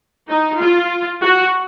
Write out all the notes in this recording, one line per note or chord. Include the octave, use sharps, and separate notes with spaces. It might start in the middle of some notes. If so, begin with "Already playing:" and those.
D#4
F4
F#4